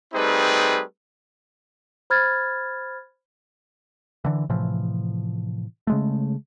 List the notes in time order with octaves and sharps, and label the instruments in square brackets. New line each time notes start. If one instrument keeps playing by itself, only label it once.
[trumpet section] G3 A3 C4 D#4 G#4 B4
[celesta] C5 B5 F6 G#6 A6
[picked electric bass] D3 E3
A2 C3 E3 F3
C#3 G#3 A3